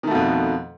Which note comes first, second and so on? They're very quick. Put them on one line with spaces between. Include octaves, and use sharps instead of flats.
D#3 A3 B2 F2